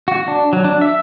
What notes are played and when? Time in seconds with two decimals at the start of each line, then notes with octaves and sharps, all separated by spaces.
0.08 F#4
0.28 D4
0.53 F#3
0.64 D4
0.81 E5